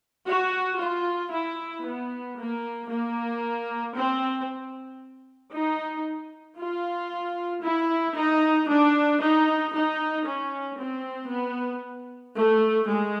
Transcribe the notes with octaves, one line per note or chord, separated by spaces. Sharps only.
F#4
F4
E4
B3
A#3
A#3
C4
D#4
F4
E4
D#4
D4
D#4
D#4
C#4
C4
B3
A3
G#3